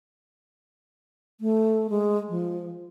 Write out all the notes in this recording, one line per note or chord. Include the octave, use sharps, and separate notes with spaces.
A3
G#3
F3